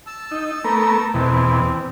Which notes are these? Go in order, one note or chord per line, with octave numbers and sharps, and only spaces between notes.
A5 E6
D#4
A3 B3 A#4
E2 B2 C4